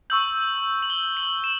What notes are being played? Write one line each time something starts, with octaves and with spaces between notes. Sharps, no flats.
C#6 E6 G6 F#7
F#7
G7
F#7
E7